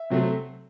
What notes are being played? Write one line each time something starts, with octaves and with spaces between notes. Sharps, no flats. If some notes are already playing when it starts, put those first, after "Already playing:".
Already playing: E5
C3 F#3 A3 C4